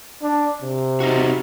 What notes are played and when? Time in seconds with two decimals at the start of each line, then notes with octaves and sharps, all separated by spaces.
0.22 D4
0.62 C3
1.00 D#4 F#4